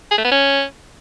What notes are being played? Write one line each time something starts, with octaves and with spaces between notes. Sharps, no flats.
G#4
A3
B3
C#4